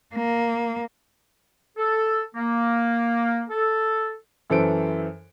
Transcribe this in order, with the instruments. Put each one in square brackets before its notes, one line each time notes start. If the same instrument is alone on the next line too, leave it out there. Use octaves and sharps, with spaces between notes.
[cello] A#3
[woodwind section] A4
A#3
A4
[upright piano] F#2 E3 A4 C5 D7